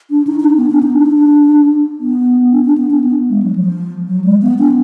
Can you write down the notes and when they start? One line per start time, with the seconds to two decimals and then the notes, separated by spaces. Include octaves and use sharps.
0.10 D4
0.27 D#4
0.40 D#4
0.44 D4
0.57 B3
0.70 D4
0.83 D#4
0.96 D4
2.00 B3
2.52 D4
2.64 D4
2.78 B3
2.90 D4
3.04 B3
3.29 G#3
3.42 F#3
3.55 F3
4.07 F#3
4.24 G#3
4.42 B3
4.59 D4